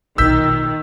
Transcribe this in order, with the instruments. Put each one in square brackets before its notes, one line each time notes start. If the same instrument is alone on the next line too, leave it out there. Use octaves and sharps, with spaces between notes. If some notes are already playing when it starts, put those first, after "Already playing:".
[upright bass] B1 A#2 [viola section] D#3 [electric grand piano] E6 G6 B6